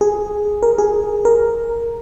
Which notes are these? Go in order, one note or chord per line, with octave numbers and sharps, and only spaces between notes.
G#4
A#4
G#4
A#4